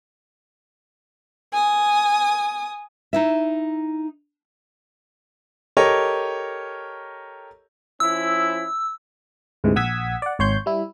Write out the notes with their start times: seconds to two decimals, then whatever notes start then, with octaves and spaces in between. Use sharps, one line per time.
1.52 G#5 D#6
3.13 D#4 E4 E5
5.77 G4 A4 A#4 C#5 D#5
8.00 F3 C#4 E4 E6
9.64 D2 G#2 C3 E3
9.76 A#1 F#5 D#6 E6 G#6 B6
10.22 D5 F#5
10.39 G#1 C#5 C6 G6
10.66 G3 E4